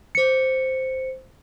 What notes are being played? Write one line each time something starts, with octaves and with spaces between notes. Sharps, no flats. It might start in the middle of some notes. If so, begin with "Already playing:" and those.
C5 C#7